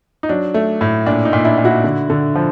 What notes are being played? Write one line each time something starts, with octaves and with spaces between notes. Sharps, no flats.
D#4
F#3 D4
A3
A2
A#2 D4
D#4
A#2
D4 E4
A#2
E4 F#4
D3
D3
F3